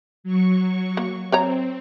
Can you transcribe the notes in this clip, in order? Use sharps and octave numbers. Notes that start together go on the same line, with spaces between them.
F#3 C#6
A#3
C4 A#4 C#5 A#5